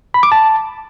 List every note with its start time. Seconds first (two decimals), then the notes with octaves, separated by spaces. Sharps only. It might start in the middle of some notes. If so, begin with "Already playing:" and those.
0.14 B5
0.23 D6
0.32 A5